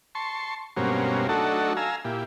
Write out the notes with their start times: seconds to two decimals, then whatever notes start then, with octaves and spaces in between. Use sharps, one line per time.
0.15 A5 C6 C#6
0.77 G2 B2 F#3 A#3 C4 C#4
1.29 F#3 A3 D4 D#4 F#4 A4
1.77 F5 G#5 A#5 E6
2.05 A#2 E4 G4